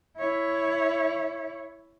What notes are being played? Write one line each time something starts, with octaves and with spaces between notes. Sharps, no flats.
E4 C#5